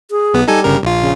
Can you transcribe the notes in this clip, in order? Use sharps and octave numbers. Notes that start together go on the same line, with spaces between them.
G#4
B1 B3
G3 D#4 A4 G#5
G1 C#3 A#4
A#1 F4
C#3